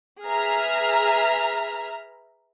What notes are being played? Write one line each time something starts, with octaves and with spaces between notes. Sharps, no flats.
G#4 B4 E5 A#5 F6